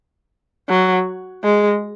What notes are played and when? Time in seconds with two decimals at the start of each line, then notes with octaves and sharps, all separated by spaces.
0.69 F#3
1.44 G#3